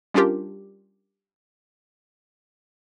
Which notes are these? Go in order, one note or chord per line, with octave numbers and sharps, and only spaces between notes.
G3 C#4 D4 F4 G4 A#4